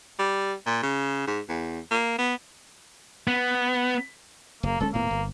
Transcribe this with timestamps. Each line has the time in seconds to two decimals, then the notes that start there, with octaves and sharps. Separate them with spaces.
0.19 G3
0.66 A#2
0.82 C#3
1.27 G#2
1.49 E2
1.91 A#3
2.18 B3
3.28 B3
4.63 F#1 A#3
4.80 D1 G#3 C#4 A4
4.94 D#1 A2 A#3 B3
5.11 G1